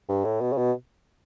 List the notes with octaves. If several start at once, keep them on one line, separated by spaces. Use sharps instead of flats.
G2
A2
B2
C#3
B2